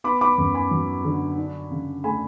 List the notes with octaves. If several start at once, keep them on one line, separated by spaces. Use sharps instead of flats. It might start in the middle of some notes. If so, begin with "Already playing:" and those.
B3 B5 D6
B5 D6
F#2
G#5 B5
F#3
D3
D4
C#3
A3 G#5 B5